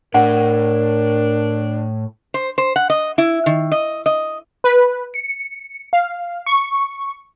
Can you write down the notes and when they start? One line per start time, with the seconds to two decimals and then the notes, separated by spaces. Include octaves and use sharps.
0.14 A2 D4 A#4 F#5
2.34 C5
2.58 C5
2.76 F#5
2.90 D#5
3.18 E4
3.46 D#3
3.72 D#5
4.06 D#5
4.64 B4
5.14 C#7
5.93 F5
6.46 C#6